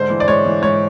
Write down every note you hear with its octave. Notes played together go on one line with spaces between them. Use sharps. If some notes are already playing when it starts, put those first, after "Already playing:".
Already playing: G#2 D3 C5
E3
D5
G#2 C#5
E3
G#2 C#5